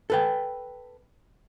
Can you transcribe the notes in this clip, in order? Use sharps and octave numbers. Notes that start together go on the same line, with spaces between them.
A4 B4 G5